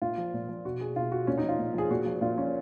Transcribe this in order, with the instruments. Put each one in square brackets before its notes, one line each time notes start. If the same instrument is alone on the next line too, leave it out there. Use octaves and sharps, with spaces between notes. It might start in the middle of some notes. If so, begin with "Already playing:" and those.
[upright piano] A#2 F4
F3
A#2
F3
B2 F#4
G#4
B2 F4
F#4
A#2 C#4
D#4
F3 F4
A#2
F3 G#4
A#2 F#4
F3
A#2 F4
F3 C#4